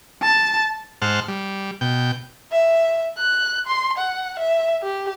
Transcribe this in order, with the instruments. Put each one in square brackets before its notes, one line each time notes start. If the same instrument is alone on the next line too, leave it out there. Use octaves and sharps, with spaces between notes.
[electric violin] A5
[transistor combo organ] G#2 C5 F#5 A5 F6
G3
B2 G5
[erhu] E5
F#6
C6
F#5
E5
G4